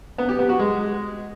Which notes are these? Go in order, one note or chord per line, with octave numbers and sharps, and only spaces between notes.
B3
G4
B3
F#4
G#3